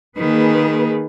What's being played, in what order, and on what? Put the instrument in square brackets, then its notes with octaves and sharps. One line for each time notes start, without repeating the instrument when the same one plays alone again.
[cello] D#3 [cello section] A#3 G#4 B4